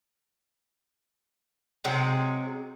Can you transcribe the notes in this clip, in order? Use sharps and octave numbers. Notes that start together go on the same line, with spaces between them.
C3 F#3 G#3 D#4